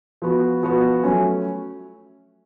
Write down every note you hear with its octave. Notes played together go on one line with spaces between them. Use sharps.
F3 B3 F#4
F3 B3 F#4
F#3 A3 C#4